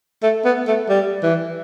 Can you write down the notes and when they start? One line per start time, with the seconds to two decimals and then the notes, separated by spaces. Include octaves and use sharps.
0.23 A3
0.45 B3
0.68 A3
0.89 G3
1.23 E3